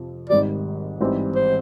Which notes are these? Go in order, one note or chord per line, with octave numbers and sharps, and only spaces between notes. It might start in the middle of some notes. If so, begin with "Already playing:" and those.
Already playing: F2 C3 F3
G#1 G#2 D#3 G3 D5
A1 G#2 E3 G3 C4
C5